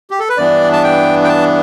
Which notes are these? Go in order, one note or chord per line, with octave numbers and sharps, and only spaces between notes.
G4
A4
B4
G2 E3 B3 D4 D5
A5
G5
G5
A5